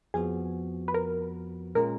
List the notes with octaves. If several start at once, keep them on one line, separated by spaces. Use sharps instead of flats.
F2 F3 B3 F#4 G#4
B4
A#4
A#2 G#3 C#4 F4 A#4